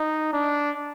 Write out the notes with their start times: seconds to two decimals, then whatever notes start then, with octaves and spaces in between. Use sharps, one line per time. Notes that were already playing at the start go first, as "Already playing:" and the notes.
Already playing: D#4
0.33 D4